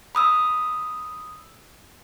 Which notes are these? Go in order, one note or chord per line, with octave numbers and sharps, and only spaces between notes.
B5 D#6 E6